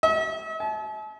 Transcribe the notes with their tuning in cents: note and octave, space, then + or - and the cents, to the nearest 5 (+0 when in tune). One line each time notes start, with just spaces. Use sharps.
E5 -45
A5 -45